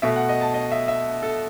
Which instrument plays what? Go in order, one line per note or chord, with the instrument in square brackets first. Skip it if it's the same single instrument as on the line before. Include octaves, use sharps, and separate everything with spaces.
[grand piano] B2 A3 E5
F#5
D#5
A5
D#5
E5
E5
A4